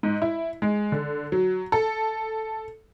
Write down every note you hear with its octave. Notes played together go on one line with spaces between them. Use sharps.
G#2
E4
G#3
D3
F#3
A4